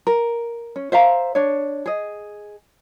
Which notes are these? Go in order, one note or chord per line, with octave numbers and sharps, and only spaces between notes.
A#4
C#4
C5 E5 F5 A#5
D4 C#5
G#4 D#5